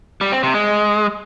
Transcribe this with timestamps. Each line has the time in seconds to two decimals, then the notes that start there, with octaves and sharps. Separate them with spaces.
0.21 G3
0.32 C4
0.43 C3
0.54 G#3